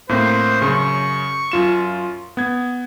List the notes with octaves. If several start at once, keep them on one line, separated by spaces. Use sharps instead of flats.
A2 A#3 C4 C5
F#2 C#3 C#6
F#2 F4 E7
B3 G#6